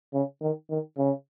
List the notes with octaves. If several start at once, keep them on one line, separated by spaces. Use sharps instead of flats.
C#3
D#3
D#3
C#3